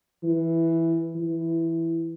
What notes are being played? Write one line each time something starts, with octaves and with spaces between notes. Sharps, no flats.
E3
E3